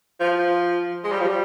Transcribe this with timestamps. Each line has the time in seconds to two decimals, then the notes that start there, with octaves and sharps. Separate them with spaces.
0.20 F3
1.04 G#3
1.12 G3
1.20 F3
1.28 G3